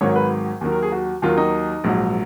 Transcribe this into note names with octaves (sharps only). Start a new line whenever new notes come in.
G#1 G#2 D#3 F#3 C#5
B4
D#2 D#3 F#3
A#4
G#4
F#4
D#2 D#3 F#3 F4
D#4
A#1 G#2 F#3